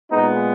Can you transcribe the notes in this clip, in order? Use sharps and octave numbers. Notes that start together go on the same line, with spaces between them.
A#2 G#3 B3 D#4